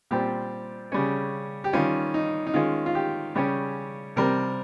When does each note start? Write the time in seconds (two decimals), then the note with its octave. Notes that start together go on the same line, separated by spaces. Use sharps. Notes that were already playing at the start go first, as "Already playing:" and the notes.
0.11 A#2 G3 C4 G4
0.92 C#3 G3 C#4
1.64 G4
1.73 D#3 G3 C#4 F4
2.14 D#4
2.47 D#4
2.54 D#3 G#3 C#4 F4
2.86 F4
2.95 G4
3.35 C#3 G3 C#4 G4
4.16 C3 G3 C4 A#4